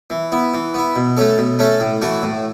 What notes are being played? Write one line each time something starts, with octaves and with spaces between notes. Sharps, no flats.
E3
B3 E4
E3
B3 E4
B2
A3 C#4 A4
B2
A3 C#4 A4
A2
E3 A3 F#4
A2